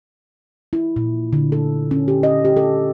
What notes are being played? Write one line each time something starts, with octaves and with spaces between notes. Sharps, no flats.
E4
A#2
D3
A4
C#4
G4
D#5
G4
A4